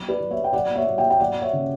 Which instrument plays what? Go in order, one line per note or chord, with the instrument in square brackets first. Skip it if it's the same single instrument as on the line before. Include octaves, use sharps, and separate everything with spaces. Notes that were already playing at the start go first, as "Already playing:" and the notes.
Already playing: [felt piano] F#3
B4 D5
F#3
C#5 E5
G5
F#3 D5 F#5
C#5 E5
F#3
E5 G5
G5
F#3 D5 F#5
C#5 E5
C#3